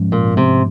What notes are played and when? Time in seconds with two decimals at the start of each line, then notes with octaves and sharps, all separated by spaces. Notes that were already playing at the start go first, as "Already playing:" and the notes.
Already playing: G#2 F3 G#3 C#4
0.12 A#2
0.37 C3